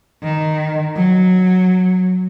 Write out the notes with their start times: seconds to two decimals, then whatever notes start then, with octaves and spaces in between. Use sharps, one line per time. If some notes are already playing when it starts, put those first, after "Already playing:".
0.23 D#3
0.96 F#3